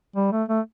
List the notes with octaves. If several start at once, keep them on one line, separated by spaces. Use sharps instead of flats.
G3
A3
A3